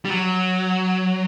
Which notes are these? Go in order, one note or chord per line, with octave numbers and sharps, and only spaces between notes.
G3
F#3